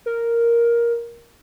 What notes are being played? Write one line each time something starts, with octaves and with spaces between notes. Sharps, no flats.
A#4